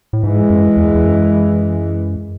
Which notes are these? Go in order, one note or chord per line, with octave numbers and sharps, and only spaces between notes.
A2
G#2 E3 G#3
F#2
E2
E2
F#2